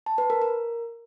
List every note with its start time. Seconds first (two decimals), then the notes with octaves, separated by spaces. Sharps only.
0.06 A5
0.18 B4
0.30 A#4
0.42 A#4